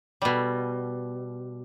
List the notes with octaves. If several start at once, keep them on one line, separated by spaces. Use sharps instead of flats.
B2 G3